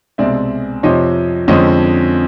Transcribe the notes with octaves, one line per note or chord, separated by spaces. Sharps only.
C2 B2 G#3 C4 D5 E5
F2 C3 F3 C#5 D#5
F2 D3 F3 G#3 C#4 C#5 D#5